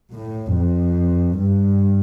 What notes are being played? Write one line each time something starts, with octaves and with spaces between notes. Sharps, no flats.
A2
F2
G2